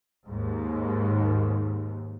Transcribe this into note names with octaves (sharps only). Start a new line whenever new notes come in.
D#2 G#2